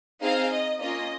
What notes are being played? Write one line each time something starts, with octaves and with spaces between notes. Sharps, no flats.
C4 D#4 G#4 F5
D#5
A#3 C#4 F4 D#5